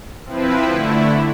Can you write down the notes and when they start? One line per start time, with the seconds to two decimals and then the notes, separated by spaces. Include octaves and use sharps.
0.25 F3 C4 E4 B4
0.67 D3 A3 E4